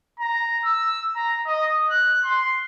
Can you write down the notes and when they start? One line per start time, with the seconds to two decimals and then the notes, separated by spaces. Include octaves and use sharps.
0.19 A#5
0.65 E6
1.16 A#5
1.47 D#5
1.90 F#6
2.25 C6